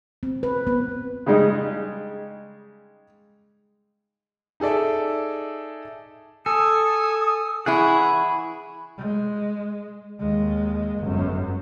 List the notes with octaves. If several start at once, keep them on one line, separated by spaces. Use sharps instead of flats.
C4
B4
B3
C#3 G3 G#3 D#4
D#4 G#4 A4 D5 E5
A4 G#5 D#6
E3 E4 G#4 F#5 C#6
G#3
D#2 G#3
G1 F#2